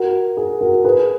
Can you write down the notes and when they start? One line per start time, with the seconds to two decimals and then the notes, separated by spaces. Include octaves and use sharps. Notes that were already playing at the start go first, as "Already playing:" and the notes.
Already playing: F#4 A#4
0.37 G#4
0.61 F#4 A#4
0.84 G#4 B4